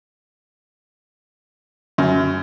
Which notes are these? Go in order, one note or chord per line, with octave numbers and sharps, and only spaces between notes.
F#2